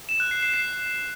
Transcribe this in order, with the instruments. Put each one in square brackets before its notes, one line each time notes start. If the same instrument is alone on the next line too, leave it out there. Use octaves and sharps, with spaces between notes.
[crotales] E7
F#6
C7
C7
C7